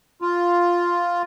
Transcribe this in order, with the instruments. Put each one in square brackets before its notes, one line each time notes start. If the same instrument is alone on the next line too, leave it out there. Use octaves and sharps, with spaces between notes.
[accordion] F4